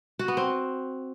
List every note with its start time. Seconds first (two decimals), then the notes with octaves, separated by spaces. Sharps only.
0.19 F#4
0.28 B3
0.37 C4